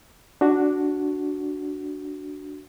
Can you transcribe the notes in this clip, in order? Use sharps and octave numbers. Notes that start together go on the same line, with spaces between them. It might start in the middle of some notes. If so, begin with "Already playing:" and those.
D4 F#4